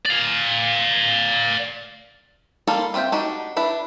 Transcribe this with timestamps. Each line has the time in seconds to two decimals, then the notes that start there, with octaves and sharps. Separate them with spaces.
0.05 D5 F5
2.67 G3 A#3 F4 A4 A5
2.94 B3 C4 F4 E5 G5
3.12 D4 D#4 F#4 G4
3.56 D4 E4 B4